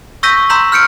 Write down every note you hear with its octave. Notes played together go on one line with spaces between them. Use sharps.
C#6 E6 G6 A#6 B6 D#7
A#5 C6 E6 G6 B6 F#7
F6 G6 C#7 D7